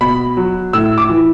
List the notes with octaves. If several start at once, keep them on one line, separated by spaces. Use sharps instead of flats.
B2 B5
F#3
A2 E6
D6
E3